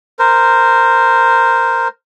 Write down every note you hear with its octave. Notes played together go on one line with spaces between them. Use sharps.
A#4 C5